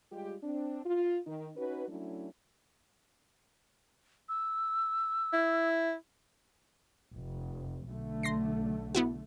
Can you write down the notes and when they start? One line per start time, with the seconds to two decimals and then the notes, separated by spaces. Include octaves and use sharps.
0.12 G3 G#3 F4 G4
0.43 C4 D4
0.86 F4
1.26 D#3
1.56 C#4 D#4 F#4 B4
1.88 F#3 A3 C#4 D4 E4
4.29 E6
5.33 E4
7.12 F1
7.88 B1 D3 A3
8.23 C6 A#6 C7
8.95 B3 E4 F#4